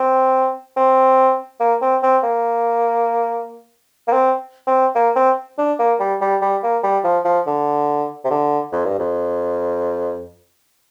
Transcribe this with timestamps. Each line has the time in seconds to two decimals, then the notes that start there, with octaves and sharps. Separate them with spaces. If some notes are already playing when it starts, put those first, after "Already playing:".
Already playing: C4
0.77 C4
1.60 A#3
1.82 C4
2.03 C4
2.23 A#3
4.08 A#3
4.12 C4
4.67 C4
4.95 A#3
5.16 C4
5.58 D4
5.79 A#3
6.00 G3
6.21 G3
6.42 G3
6.63 A#3
6.83 G3
7.04 F3
7.25 F3
7.47 D3
8.24 C3
8.30 D3
8.72 F2
8.85 G2
8.99 F2